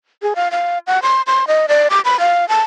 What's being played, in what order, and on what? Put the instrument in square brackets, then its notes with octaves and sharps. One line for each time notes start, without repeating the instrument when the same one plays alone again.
[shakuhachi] G#4
F5
F5
F#5
C6
C6
D#5
D5
D6
B5
F5
A5